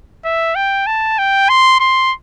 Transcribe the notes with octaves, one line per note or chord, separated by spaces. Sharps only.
E5
G5
A5
G5
C6
C6